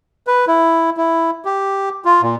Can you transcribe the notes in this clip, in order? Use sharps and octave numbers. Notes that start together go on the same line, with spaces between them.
B4
E4
E4
G4
F4
A#2